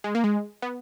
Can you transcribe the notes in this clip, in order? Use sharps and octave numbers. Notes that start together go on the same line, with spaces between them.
G#3
A#3
G#3
B3